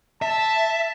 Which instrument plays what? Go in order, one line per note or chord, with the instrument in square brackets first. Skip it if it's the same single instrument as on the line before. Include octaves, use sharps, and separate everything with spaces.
[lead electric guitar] E5 [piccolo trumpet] A5